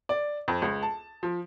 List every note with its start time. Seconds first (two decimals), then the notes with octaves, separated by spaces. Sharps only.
0.09 D5
0.48 F2
0.62 C#2
0.82 A5
1.23 F3